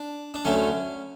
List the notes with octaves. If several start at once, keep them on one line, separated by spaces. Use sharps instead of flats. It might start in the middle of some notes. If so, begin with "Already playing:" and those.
Already playing: D4
D4
D2 D3 F#3 A3 C#4